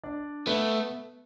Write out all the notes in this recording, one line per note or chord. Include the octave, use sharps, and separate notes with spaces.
D4 D5
A3 B3 B4